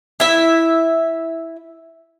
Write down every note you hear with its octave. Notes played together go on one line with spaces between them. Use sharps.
E4 E5